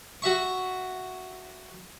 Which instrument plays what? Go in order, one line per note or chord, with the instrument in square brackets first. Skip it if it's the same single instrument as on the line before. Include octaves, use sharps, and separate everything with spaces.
[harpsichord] F#4 E5 C#6